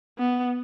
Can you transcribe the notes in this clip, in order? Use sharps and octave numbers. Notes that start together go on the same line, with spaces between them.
B3